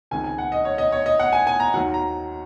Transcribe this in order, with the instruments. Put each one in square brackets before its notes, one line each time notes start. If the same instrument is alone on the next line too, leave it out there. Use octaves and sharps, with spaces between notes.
[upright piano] C#2 C3 D#3 G#5
G#5
F#5
D#5
C#5
D#5
C#5
D#5
F#5
G#5
G#5
A#5
D#2 D#3 F#3 F#5
A#5